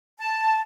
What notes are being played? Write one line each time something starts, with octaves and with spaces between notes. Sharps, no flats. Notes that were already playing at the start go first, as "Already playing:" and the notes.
A5